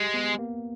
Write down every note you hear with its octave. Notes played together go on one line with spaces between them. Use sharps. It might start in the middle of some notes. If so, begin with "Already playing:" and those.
Already playing: G#3 G4
B3
A#3